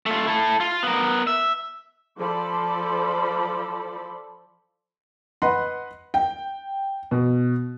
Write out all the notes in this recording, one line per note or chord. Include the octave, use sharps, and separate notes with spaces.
A3 F4
E4 A4
F4
B3 A#4
E5
F3 A4 C5 D5 B5
B4 D#5 F#5 B5 C6
G5
B2